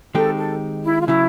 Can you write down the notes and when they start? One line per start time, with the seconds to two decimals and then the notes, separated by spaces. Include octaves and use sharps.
0.15 D#3 G#3 C4 D#4 G4 A4
0.37 A4
0.84 E4
1.01 F4
1.07 C#3 F#3 E4